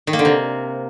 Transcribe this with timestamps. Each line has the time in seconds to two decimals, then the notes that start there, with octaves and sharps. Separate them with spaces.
0.07 D#3
0.13 A#3
0.19 D3
0.25 C3